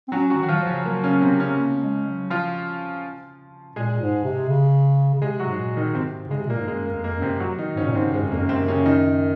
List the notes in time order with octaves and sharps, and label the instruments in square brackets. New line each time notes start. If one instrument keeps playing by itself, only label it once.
[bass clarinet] C4
[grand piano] F#3 F#4 [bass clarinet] C#4
[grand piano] F#3 F#4
[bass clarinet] D#3
[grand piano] F#4
F3 F4
[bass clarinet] F#3
F3
[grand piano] C#3 C#4
[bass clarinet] F#3 [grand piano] A#3
[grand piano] C#3 C#4
C3 C4
C#3 C#4
[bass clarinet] A#3
A#3
G#3
F#3
[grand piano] F3 F4
[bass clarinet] A#2 [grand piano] G#3 G#4
[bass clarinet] G#2
C3
C#3
C#3
[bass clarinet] C3 [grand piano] G#3 G#4
[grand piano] F#3 F#4
[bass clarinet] G#2
A#2
[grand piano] D#3 D#4
[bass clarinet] G#2 [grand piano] C3 C4
[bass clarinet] C#3 [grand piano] G#3
[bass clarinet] C3
[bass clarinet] A#2 [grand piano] A#3
[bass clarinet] G#2
[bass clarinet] F#2 [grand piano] G#3
[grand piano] A#3
[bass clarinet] F2
[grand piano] A#3
[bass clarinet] F#2
[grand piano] C3 C4
F#3 F#4
D#3 D#4
[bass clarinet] G#2 [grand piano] C#3 C#4
[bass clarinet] A#2
[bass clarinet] G#2 [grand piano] C3 C4
[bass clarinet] G#2 [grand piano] G#3
[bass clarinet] F#2
[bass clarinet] F2 [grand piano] A#3
[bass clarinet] F#2
[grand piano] C3 C4
C#3 C#4
D#3 D#4